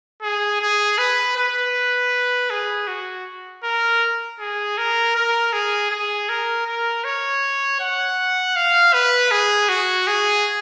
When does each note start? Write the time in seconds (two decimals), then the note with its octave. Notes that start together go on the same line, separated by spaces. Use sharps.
0.22 G#4
0.61 G#4
0.98 B4
1.37 B4
2.50 G#4
2.88 F#4
3.64 A#4
4.40 G#4
4.78 A#4
5.15 A#4
5.53 G#4
5.90 G#4
6.29 A#4
6.67 A#4
7.04 C#5
7.80 F#5
8.56 F5
8.94 B4
9.31 G#4
9.69 F#4
10.07 G#4